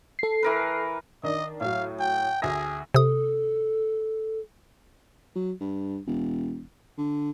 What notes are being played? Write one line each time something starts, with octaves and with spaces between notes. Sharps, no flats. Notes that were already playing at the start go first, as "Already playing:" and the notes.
A4 C7
E3 A#4 B4
D#3 D4 D#5
A2 F#3 F5
G5
D2 G#4 E5 A#6
C3 A4 D#6
F#3
G2
E1
D3